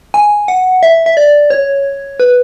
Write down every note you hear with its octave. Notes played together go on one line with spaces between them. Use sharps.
G#5
F#5
E5
E5
D5
C#5
B4